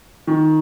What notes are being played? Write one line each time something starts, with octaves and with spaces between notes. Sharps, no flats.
D#3